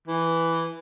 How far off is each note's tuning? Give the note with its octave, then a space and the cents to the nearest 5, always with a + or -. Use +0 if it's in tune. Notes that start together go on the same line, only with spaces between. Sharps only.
E3 +5